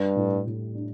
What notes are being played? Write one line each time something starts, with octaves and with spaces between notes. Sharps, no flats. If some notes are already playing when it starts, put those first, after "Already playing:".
Already playing: G2 G3
A2
A2
D4